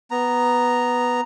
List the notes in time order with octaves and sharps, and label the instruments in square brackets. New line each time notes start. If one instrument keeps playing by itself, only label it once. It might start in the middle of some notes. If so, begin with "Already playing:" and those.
[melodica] B3 A#5